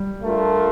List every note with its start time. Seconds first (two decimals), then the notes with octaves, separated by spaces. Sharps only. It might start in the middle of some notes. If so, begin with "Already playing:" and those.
Already playing: G3
0.22 A3 D4 F4 A#4